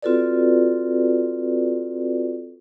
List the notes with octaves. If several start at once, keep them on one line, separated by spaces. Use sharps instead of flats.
C4 F4 F#4 A4 B4 D5